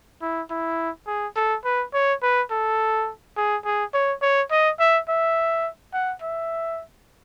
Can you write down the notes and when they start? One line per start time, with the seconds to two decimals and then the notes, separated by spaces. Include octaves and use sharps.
0.22 E4
0.50 E4
1.07 G#4
1.36 A4
1.65 B4
1.94 C#5
2.22 B4
2.51 A4
3.37 G#4
3.65 G#4
3.94 C#5
4.22 C#5
4.51 D#5
4.79 E5
5.09 E5
5.93 F#5
6.22 E5